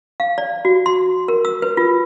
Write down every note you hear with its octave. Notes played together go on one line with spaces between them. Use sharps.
F5
D5
F#4
C6
A#4
E6
B4
F4